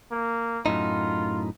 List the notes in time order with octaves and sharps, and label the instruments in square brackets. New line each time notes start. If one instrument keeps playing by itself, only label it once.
[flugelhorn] A#3
[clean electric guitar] F#2 A2 D#4 [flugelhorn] F4